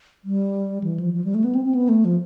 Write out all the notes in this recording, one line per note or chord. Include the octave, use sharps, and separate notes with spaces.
G3
E3
F3
F3
G3
A3
B3
C4
C4
B3
A3
F3